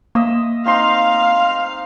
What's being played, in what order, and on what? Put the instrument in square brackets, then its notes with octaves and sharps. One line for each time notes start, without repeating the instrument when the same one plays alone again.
[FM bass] A#3 [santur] D#5 E5 D#6
[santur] C4 D#4 C6 [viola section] F5